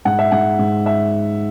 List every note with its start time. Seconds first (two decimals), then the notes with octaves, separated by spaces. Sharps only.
0.05 G#2 F#5
0.19 E5
0.32 G#2 F#5
0.59 G#2
0.86 E5